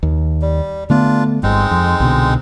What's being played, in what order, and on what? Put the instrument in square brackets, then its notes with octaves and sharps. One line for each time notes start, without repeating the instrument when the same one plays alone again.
[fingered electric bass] D#2
[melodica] G3
[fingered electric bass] D3 A3 B3 [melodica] D4 F4
[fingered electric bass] G1 G2 [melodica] G#3 C4 D#4
[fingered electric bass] F2
C2 B2 D3